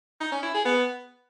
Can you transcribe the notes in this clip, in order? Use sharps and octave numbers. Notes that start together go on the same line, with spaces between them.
D#4
C#4
E4
G#4
B3